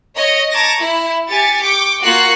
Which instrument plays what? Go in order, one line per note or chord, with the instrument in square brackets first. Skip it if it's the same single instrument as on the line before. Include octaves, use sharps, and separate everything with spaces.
[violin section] C#5 D#5
A5 A#5 C#6 D6 G#6 A#6
E4
G4 G#5 A6 C#7
G5 C#6 D6
A#3 F4 F#4 C#6 F#6 C7